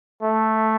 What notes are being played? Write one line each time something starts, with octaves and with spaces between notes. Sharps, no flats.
A3